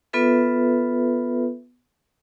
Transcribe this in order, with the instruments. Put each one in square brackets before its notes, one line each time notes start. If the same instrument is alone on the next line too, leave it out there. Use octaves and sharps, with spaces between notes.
[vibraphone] B3 F4 A4 B4 E5